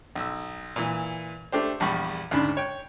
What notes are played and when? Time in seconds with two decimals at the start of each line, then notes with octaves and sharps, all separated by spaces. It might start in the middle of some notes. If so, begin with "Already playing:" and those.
0.15 B1 E6
0.76 A#2 E3
1.52 A3 D4 G4 C5
1.80 A#1 E2 G3 B5 C#6
2.31 D2 G#2 C#3 D4 B5
2.57 C#5 G5